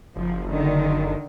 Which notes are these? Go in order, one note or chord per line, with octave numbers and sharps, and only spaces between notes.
F#1 F3
D3 D#3